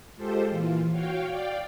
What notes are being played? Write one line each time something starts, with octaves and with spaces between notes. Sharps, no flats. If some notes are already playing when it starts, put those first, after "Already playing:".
G#3 F4 G4 A4 C5
A#2 E3 F4
F#4 C#5 F5 G5
D5 F5 G5